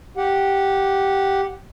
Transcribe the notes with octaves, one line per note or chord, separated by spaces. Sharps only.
G4 F#5